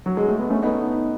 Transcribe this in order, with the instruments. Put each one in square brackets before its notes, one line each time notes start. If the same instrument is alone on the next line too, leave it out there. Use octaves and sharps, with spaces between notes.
[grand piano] F#3
G#3
A3
B3
A3 C#4
B3 D#4